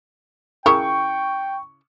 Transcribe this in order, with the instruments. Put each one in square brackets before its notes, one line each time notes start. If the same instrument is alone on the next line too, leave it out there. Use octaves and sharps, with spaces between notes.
[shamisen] C#3 E4 A#4 [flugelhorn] G5 [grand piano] C#6